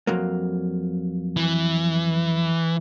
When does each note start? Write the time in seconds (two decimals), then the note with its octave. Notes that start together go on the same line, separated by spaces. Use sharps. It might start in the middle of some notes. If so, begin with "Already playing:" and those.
0.07 F2 F#3 A#3
1.37 E3